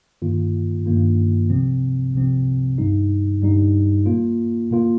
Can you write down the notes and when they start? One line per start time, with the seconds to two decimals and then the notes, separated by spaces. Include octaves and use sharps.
0.22 G2 D#3 A#3 F4
0.86 G2 D#3 A#3 F4
1.50 C2 C3 F3 C4
2.14 C2 C3 F3 C4
2.78 G2 G3 D#4
3.42 G2 G3 D#4
4.06 A#2 A#3 F4
4.71 A#2 A#3 F4